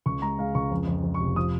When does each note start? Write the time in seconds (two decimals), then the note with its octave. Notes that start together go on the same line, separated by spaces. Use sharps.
0.06 C#2 C#6
0.22 G#3 A#5
0.39 G#3 F5
0.55 C#2 C#6
0.71 F2
0.87 F2
1.03 F2
1.14 C#6
1.20 F1
1.36 F3 D#6